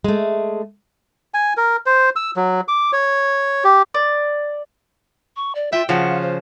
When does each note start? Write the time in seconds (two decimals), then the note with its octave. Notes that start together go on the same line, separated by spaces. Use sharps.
0.04 G#3 A3
1.34 G#5
1.57 A#4
1.86 C5
2.16 E6
2.36 F#3
2.68 D6
2.93 C#5
3.64 G4
3.94 D5
5.36 C#6
5.55 D5
5.72 F4 E5 G5
5.89 C#3 F3 F4 F#4 F#5
6.22 C5